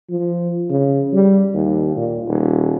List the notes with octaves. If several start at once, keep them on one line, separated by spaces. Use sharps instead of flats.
F3
C#3
G3
D#2
A#2
D#1